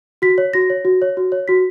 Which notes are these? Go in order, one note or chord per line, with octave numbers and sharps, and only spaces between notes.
F#4 B6
C#5
F#4 A#6
C#5
F#4
C#5
F#4
C#5
F#4 B6